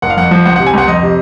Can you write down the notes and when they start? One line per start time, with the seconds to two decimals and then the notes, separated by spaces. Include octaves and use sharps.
0.02 F#1 F#5
0.10 F5
0.17 F2 F#5
0.31 F3
0.45 C#2 F#5
0.56 C3 F#5
0.66 G#5
0.73 C#2 F#5
0.88 F2 D#5
1.03 C3